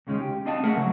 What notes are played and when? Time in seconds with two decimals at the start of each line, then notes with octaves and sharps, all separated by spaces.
0.07 D#2 C#3 G#3 C#4 D#4
0.21 G4
0.45 C4 D4 D#5 F5 F#5 A5
0.64 A3 C#4 G#4 A#4 E5 F#5
0.76 C#3 F#3